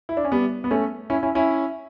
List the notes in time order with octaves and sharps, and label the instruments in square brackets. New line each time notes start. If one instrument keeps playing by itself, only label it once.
[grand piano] E4
D4
C#4
G3 B3
B3
A3 C#4
C#4 E4
C#4 E4
C#4 E4